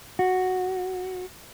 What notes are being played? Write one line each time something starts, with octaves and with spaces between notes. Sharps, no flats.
F#4